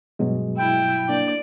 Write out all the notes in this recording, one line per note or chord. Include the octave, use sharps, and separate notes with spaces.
G2 B2 F#3 G#3
E4 G5
A#3 D4 D5